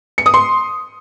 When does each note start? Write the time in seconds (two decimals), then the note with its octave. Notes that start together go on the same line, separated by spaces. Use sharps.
0.18 C#7
0.26 D#6
0.34 C6